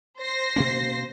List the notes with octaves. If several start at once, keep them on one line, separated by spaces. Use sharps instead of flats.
C5 A#6 C7
B2 A#3 C#4